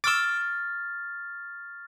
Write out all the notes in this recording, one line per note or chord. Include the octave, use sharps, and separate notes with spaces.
C#6 D6 E6 F6 A6